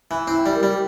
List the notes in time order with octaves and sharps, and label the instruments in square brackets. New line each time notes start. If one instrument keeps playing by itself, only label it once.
[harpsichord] E3
[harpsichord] C4 [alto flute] E4
[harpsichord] G3
[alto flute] A#4
[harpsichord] G3